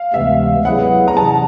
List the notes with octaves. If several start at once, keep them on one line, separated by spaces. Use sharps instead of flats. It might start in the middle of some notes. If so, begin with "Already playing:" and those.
Already playing: F5
D2 C3 E3 G#3 B3 E5
F#3 B3 E4 G#4 B4 F#5
A#5
C3 E3 A5